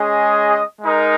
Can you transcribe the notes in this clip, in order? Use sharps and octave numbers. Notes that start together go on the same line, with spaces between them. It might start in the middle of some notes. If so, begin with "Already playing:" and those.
Already playing: G#3 C#4 G#4 D#5
G#3 D#4 A#4